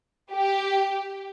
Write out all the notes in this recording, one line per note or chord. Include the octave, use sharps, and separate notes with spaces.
G4